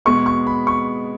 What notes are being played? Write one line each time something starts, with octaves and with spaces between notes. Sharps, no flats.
B2 G#3 B3 C#6
C#6
B5
C#6